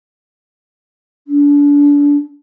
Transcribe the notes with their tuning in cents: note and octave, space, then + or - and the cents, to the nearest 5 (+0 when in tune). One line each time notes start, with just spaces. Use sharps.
D4 -30